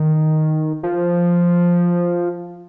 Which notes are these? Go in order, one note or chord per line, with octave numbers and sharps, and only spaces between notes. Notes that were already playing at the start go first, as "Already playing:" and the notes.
Already playing: D#3
F3